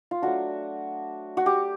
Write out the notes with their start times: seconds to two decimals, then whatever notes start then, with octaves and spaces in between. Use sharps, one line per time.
0.11 F4
0.22 F#3 A3 D4 F#4
1.37 F#4
1.46 G4